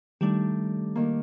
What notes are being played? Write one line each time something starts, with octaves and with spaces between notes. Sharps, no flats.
D#3 G3 A3 D4 G4
D#3 A#3